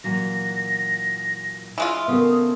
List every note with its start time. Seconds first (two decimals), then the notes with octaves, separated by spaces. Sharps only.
0.04 A#2 E3 F#3 A#6
1.78 E3 G#3 F4 E5
2.08 C#3 A3 B3 C4 A#4 D#6